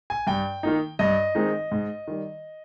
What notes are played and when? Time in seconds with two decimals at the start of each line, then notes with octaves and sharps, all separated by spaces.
0.10 G#5
0.27 G2 G5
0.63 D#3 A#3 D#4
0.99 G2 D#5
1.35 D#3 G#3 C4 D#4
1.71 G#2
2.08 D#3 G3